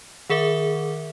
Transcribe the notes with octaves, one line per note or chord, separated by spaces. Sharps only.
D#3 G#4 A#4 E5 D6